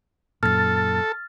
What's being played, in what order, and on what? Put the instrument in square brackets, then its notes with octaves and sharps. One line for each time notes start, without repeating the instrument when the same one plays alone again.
[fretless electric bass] F#2 A#2 [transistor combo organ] A4 [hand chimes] F6 A6